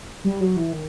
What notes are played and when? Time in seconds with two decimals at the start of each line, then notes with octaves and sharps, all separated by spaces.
0.24 G3
0.41 F#3
0.56 E3
0.72 D#3